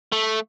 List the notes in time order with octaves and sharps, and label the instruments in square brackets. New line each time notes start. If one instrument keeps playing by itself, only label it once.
[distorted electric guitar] A3